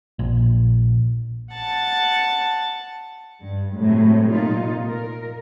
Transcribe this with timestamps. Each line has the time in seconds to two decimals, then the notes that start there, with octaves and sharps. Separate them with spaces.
0.19 A#1
1.52 F#5 A5 A6
3.41 G2
3.78 A2 C3 F#3 G#3
4.31 A#2 D#4 F4
4.87 A#4